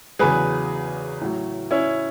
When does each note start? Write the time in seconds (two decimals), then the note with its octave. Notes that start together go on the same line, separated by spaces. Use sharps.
0.19 E2 C#3 F#3 G#4 B4
1.21 A2 F#3
1.71 C#4 E4